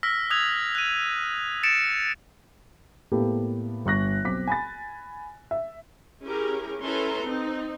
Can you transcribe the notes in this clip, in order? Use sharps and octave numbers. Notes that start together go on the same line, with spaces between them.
E6 F6 A#6 B6
D#6 E6 F#6 G#6 F7
F#6 D#7
A6 C#7 D7 E7
A2 A#3 B3 G4 A4
G1 C#6 F#6 A#6
B1 C4 D6 B6
G#5 B5 A6
E5
C#4 E4 G4 G#4 A#4
C#4 E4 A4 B4 A#5 C6
C4 D#4